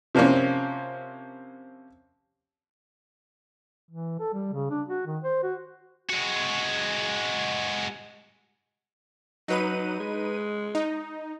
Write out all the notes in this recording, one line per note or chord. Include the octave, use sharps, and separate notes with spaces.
C3 F3 A#3 C4 C#4
E3
A4
G3
C#3
D4
F#4
D#3
C5
F#4
G#3 F#4
F#3 D#4 B4 D#7
G#3
D#4